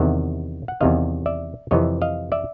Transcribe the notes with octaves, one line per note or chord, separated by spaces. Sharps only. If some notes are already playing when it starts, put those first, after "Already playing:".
Already playing: E2 C3 D#3 E5 F#5
F#5
E2 C3 D#3 D#5 F5
D5 E5
F2 C3 E3 C#5 D#5
D#5 F5
D5 E5